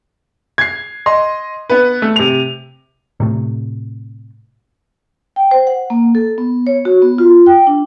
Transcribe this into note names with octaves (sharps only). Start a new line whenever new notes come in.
G#6 C7
D#5 C6
B3 B4
A3
C3 F7
A2 C3 A3
G5
C5
F#5
A#3
A4
B3
C#5
F#4
B3
F4
G5
D4